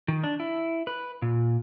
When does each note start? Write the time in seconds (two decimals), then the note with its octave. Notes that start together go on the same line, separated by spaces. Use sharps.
0.08 D#3
0.24 D4
0.40 E4
0.87 B4
1.22 A#2